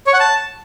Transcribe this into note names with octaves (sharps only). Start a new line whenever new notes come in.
C#5
F#5
A5